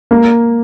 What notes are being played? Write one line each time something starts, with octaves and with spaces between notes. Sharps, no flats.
A#3